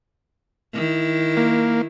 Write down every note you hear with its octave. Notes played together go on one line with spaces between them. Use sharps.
D#3 E4
A#3